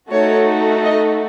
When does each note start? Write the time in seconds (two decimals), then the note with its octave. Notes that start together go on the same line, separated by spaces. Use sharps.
0.11 A3 D#4 F#4 A4 C#5
0.84 D#5